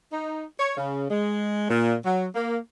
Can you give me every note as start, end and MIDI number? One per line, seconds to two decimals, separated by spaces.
0.12 0.44 63
0.59 0.73 73
0.77 1.05 49
1.10 1.68 56
1.69 1.94 46
2.05 2.24 54
2.34 2.56 58